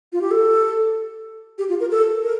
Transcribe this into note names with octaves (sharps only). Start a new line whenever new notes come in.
F4
G4
A4
G4
F4
A#4
A4
A#4